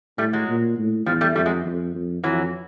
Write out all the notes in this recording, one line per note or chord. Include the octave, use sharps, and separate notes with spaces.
A2 G3 A3
F#3 G#3
A#2
A2
E2 F3 G3
G3 A3
F2 G3 A3
F#3 G#3
F2
F2
F2 E3 F#3